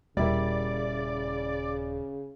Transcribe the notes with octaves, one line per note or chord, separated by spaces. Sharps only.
D#1 C#3 G3 E4 A#4 D5